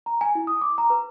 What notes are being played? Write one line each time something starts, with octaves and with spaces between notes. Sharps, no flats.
A#5
G#5
E4
D#6
D6
A#5
B4